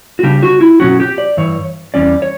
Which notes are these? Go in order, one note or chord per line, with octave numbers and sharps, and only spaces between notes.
F#4
C#3 G3 D4 G4
F#4
E4
B2 F#3 C#4 F#4
G4
D5
G2 E3 C#5
E2 C#3 G3 C#4 D5
C#5